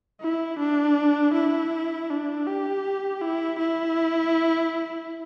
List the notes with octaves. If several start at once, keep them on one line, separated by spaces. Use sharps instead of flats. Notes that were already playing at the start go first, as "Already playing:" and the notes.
E4
D4
E4
D4
G4
E4
E4